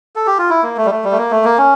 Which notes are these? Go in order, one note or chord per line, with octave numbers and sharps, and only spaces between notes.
A4
G4
F4
E4
A#3
A3
G3
A3
G3
A3
A#3
A3
A#3
C#4